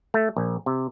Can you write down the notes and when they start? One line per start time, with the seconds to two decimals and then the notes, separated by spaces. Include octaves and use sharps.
0.14 A3
0.37 A#1
0.66 C3